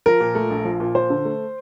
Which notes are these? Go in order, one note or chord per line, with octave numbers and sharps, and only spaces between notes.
F3 A#4
A#2
A3
A#1
F3
A#2
F3 C5
D3
A3